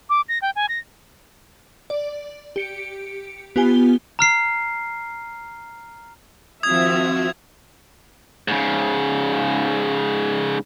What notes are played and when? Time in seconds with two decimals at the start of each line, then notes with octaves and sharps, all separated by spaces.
0.10 D6
0.28 A#6
0.42 G5
0.56 G#5
0.69 A#6
1.90 D5
2.56 G4 C#7 D7
3.56 B3 F4 G4 G#5 G7
4.19 A#5 F6 C7
6.63 D#3 F3 C4 F#4 E5 D#6 G#6
8.48 G#2 C#3